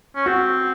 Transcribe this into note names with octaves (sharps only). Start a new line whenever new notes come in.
C#4
C4 F#4